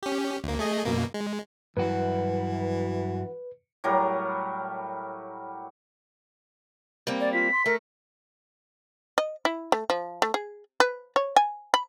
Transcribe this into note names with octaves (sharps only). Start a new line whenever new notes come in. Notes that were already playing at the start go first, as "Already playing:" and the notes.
C#4 G4
D2 A#3
A3 G#4 D#5
F#2 B2 A#3
G#3
G2 E3 F#3 F#4 B4
A2 F#3 G3 A#4
G3 A#3 C4
D5
F4 B6
C6
A3 A#4
D#5
E4
A3
F3
A3
G#4
B4
C#5
G#5
B5